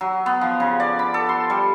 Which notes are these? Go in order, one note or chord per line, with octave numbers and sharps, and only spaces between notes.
F#3
B3
F3
C#3
D5
B5
A4
C6
G3